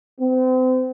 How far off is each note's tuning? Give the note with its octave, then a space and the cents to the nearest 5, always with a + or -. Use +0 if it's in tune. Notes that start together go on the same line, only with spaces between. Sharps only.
C4 -35